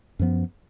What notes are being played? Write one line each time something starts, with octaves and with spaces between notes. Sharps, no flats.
F#2 F3 B3